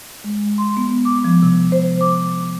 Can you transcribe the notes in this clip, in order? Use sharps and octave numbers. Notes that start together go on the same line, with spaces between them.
G#3
C6
B3
D6
F3
C3
C5
D6